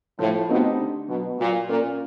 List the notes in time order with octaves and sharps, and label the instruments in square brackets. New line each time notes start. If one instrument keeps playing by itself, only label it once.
[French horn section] A2 [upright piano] F3
[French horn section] B2 [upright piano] A3 C4 D#4 G4
[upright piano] D3
[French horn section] B2 [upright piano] F#3 B3
[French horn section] A#2 [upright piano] F#3
[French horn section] A#2 [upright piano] A#3 C#4 F4 A#4